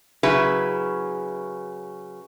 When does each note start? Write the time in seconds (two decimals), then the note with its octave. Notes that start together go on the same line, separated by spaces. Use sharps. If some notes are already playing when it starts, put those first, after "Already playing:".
0.23 C#3 F#3 E4 G#4 B4